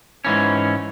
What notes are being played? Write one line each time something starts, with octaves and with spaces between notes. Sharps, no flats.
G#2 E3 C#4